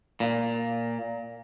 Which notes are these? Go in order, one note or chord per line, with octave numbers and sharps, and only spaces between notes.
A#2